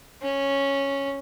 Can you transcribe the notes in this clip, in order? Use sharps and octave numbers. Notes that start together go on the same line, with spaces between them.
C#4